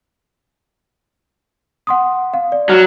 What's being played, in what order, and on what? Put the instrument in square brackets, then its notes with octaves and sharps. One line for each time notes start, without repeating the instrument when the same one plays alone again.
[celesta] F#5 C6 D#6
F5
D5
[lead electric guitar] F#3 [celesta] F6